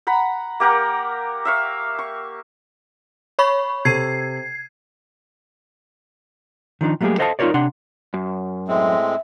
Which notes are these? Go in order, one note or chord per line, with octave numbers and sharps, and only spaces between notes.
F#5 A#5 B5
A#3 G4 A#4 F#5
E5 F5 C#6
C#6
C#5 B5 C#6
C3 A4 G#6 C7 D#7
D#3 F3 D4 D#4
F#3 G3 A3 A#3 G4 G#4
A4 C5 D#5 F5 F#5 A5
D#4 F4 G#4 A#4 C#5 D5
C3 D4 F#5 C6
F#2
A2 G#3 C4 E5